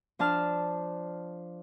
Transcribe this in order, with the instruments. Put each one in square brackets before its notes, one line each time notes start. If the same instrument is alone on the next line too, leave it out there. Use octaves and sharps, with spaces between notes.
[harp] F3 D4 A5 F6